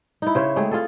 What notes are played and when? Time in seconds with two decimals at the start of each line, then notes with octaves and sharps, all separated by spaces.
0.22 D#4 E4
0.35 C#3 C5 C#5 E5
0.56 G#3 A3 C4 G#4
0.71 F4 G#4 A4